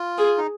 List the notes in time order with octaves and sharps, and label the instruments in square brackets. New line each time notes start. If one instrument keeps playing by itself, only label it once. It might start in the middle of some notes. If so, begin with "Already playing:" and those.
Already playing: [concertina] F4
[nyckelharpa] G#4
[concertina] D#4